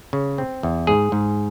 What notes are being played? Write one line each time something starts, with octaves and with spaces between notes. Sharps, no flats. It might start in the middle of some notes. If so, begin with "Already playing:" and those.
C#3
C4
E2
G#2 G#4
G#2